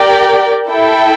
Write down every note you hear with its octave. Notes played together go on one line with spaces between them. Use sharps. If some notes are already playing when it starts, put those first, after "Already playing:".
Already playing: G4 A#4 D5 G5
E4 A4 E5 G5